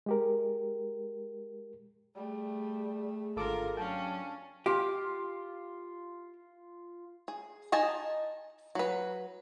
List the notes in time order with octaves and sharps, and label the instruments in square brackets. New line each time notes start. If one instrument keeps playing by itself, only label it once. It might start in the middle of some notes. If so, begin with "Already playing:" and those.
[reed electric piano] G#3 G4 A#4
[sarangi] G3 [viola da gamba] A3 [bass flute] G#4
[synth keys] G#1 A4 D6 [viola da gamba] D3 A#4 [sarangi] F4
[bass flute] F#3 [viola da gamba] C#4 D4 [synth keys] F5 G5 [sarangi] A5
[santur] F4 [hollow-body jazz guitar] G4
[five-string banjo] G#4
D#4 D#5 G#5 A5
F#3 B4